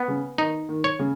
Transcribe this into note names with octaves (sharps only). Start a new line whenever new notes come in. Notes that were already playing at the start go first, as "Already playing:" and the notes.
Already playing: B3
C#3
D#3 D#4
D#3
C#5
C#3